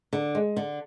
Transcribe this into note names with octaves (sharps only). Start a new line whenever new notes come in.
D3
G#3
D3